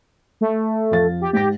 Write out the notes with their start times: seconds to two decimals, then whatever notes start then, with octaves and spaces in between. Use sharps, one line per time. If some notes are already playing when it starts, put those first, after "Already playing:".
0.41 A3
0.91 F2 F5 A6
1.21 G4
1.33 G#2 G4 A#6